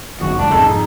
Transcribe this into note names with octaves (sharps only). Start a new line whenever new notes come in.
G1 F#2 D#3 F#4
F#1 C#2 G#2 D4
F1 C#2 G#2 A4
F2 D#4